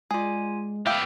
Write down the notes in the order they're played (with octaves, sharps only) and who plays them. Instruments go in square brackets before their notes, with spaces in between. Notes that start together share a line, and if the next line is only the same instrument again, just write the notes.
[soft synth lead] G#3 [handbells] F4 G#5 [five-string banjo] G#4 D5
[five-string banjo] A3 F5 G5 [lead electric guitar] B3 G4 [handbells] E6 F6